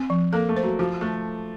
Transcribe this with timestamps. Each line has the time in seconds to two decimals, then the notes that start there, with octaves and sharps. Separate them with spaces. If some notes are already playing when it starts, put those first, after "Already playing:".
Already playing: C4
0.10 F3
0.33 A#3 A4
0.49 A3
0.56 C5
0.63 F#3
0.79 F3 F#4
1.01 A3 A4